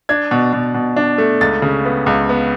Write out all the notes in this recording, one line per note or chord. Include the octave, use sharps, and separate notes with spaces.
D4 G#6
B2
B2
B2
D4
A3
C#2 A6
C#3
B3
C#2
B3